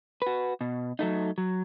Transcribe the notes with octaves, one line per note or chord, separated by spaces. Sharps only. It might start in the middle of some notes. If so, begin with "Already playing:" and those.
F#4 B4
B2
F#3 A3 D#4
F#3